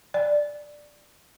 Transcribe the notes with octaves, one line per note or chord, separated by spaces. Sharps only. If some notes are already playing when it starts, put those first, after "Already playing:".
D5